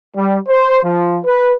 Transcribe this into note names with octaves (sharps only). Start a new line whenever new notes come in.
G3
C5
F3
B4